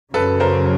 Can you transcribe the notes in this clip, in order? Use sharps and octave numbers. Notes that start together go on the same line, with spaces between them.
F#2 C#3 F#3 A4 B4
A#4 C5